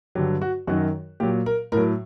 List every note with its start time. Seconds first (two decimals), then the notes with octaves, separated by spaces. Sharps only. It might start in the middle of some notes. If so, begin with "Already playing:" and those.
0.15 G2 D3 F#3 G4
0.41 F#4
0.67 F#2 D#3 F#3 F#4
1.20 A#2 F#3 G4
1.46 A#4
1.72 A2 F#3 A#4